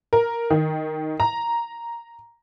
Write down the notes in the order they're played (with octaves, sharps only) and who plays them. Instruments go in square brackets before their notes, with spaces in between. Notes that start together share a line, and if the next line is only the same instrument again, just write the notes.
[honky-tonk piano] A#4
D#3
A#5